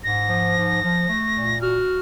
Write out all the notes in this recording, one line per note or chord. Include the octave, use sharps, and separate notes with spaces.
G#2 A#6
F3
G#2
F3
A3
A#2
F#4 F6